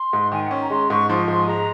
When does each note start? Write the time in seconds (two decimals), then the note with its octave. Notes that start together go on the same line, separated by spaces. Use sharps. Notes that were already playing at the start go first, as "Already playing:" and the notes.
Already playing: C6
0.13 G#2
0.32 D#3 G#5
0.42 F#5
0.51 C#4
0.61 A#5
0.70 G#3 C6
0.90 G#2 C#6
1.09 F3 C6
1.28 G#2 C6
1.38 G#5
1.48 G#3 A#5